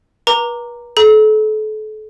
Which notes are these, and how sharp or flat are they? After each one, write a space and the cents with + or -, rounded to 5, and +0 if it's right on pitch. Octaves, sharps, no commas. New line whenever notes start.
B4 -40 A#5 -10 D6 +0
A4 -35 A#5 +20